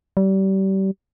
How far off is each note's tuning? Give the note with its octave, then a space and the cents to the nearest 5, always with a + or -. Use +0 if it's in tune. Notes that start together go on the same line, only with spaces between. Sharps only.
G3 -30